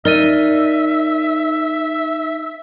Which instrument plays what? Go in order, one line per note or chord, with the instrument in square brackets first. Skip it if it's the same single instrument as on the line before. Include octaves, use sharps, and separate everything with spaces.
[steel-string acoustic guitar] D#4 [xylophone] A#4 D5 D#7 [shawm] E5